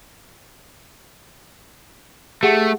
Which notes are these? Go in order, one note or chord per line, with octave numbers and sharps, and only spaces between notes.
A3 G4 G#4 F#5